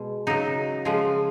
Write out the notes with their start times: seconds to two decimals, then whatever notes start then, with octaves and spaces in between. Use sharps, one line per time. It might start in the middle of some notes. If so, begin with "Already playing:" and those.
Already playing: B2 G#3
0.27 C#3 F#3 D#4
0.85 C#3 F3 G#3